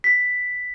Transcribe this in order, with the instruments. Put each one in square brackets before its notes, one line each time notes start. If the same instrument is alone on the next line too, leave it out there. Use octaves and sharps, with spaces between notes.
[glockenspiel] B6